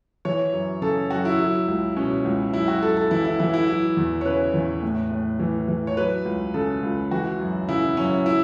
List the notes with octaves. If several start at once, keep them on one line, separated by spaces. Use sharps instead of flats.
E3 C#5
F#2
C#3 A4
F#2 F#4
E4
F#3
C#2
B2 C#4
C#2
F#2 E4
F#4
F#2 A4
A4
E3 E4
E4
E3 E4
E4
F#3 E4
E2
C#5
C#3 B4
E2
A2
A2
E3
E3
C#5
F#3 B4
C#2
C#3 A4
C#2
E3 F#4
F#2
C#3 E4
F#2 C#4
E4